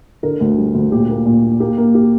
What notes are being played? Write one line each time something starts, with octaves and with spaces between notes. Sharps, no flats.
D3 A#4
D2
G3
D2
A#2 G4
A#3
A#2
A#3
A#3 G4
A#3
G4